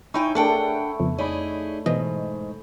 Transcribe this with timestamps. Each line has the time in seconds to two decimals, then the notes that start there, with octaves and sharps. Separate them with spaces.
0.14 D#4 E4 C#5 G5 G#5 C#6
0.35 A3 D4 G#4 A#4 D5 F#5 G5
1.00 F2 C#3 B3
1.18 D#4 E4 G#4 C#5 D5 B5
1.86 G#2 B2 E3 D#5